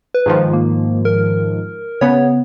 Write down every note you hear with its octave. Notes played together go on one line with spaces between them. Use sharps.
B4
G#2 D#3 F3
A#3
A#4
C#3 B3 C#5